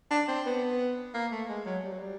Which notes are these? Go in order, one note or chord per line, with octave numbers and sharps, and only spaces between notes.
D4
C4
B3
A#3
A3
G#3
F#3
G3
F#3
G3